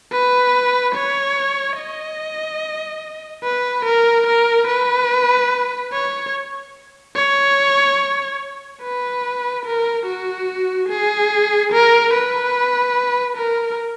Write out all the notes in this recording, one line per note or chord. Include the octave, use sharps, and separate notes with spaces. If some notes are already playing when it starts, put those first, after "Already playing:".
B4
C#5
D#5
B4
A#4
A#4
B4
C#5
C#5
B4
A#4
F#4
G#4
A#4
B4
A#4